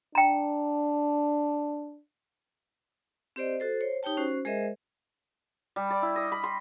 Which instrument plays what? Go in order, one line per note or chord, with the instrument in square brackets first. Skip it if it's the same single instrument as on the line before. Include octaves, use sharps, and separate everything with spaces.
[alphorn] D4 [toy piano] G5 A#5
[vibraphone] C4 G4 C5 D5 D#5
F#4 A4 C5
C5 C#5
D#4 G4 C#5 G5 A5
C#4 F#4 C5
G#3 G#4 A#4 C5 D#5 E5
[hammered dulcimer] G3
D5
E4
D#5
B5
C6